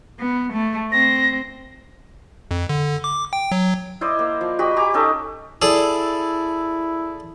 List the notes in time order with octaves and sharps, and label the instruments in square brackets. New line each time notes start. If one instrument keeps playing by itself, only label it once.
[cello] B3
A3
[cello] C4 [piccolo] A#6
[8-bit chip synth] F2
D3
D6
G5
F#3
[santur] E4 C5 D5 D#5
A#3
F3
F#4 G4 D#5 B5
G4 A#5 D6
C#4 D#4 A4 F#5
[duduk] E4 [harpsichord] G#4 A4 D5